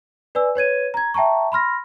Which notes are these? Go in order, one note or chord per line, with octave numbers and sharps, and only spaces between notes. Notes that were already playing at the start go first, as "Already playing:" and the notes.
B4 D5 G#5 E6
B4 C#5 G#6 D#7
A#5 G#6
E5 G5 A5 A#5 C#6
B5 C6 F6 A#6